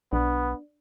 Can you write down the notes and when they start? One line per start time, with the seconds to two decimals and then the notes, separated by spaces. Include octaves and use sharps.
0.13 B1 B3 D4